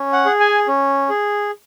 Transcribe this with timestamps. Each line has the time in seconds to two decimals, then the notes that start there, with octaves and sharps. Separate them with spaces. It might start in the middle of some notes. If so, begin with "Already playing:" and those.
Already playing: C#4
0.13 F#5
0.26 G#4
0.40 G#5
0.68 C#4
1.09 G#4